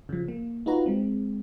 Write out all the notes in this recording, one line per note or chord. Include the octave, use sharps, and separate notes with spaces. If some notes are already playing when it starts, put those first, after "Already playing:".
C#3 F3
A#3
D#4 F4 F#4 B4 A#5
G#3 C4